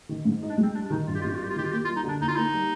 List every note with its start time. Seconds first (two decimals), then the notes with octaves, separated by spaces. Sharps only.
0.09 D#3
0.25 G#2
0.43 D#4
0.50 D4
0.58 G#3
0.63 C4
0.75 G3 D4
0.86 D4
0.90 D#3 D#4
1.07 G2 F4
1.15 G4
1.21 G#1 F4
1.29 G4
1.36 F4
1.40 G3 G4
1.50 F4
1.56 D#3 G4
1.64 F4
1.72 A#3 G4
1.85 F4
1.88 G3
1.96 D#4
2.04 D3 D4
2.20 D#2 D#4
2.28 F4
2.36 A#3 D#4
2.53 G3